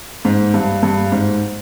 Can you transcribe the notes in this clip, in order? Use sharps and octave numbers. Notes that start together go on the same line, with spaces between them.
G#2
G2
G2
G#2